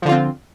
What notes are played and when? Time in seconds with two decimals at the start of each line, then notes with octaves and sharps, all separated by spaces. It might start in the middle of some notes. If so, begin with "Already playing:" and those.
0.02 F3
0.05 D3
0.08 F4
0.12 C4